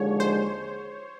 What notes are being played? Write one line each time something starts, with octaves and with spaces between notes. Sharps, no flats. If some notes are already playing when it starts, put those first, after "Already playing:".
Already playing: D#2 D3 F3 G#3 C#5
C5